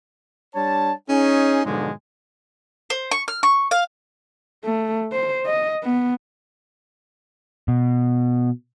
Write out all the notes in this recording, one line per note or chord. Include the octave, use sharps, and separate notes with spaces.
G3 D4 C#5 A5
C#4 D#4 G#4
G#2 B2 D3 F3 F#3 G#3
C5
C#6
F6
C#6
F5
A3
C5
D#5
B3
B2